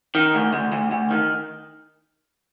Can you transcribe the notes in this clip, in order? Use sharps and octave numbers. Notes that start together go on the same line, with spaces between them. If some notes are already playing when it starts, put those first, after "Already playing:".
D#3
D2
D2
D2
D2
D#3